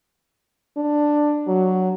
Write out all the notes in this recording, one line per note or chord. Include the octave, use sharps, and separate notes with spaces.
D4
F#3